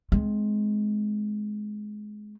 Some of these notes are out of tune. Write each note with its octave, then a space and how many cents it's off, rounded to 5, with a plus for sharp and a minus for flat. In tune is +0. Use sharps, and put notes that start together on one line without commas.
G#3 +20 C4 -15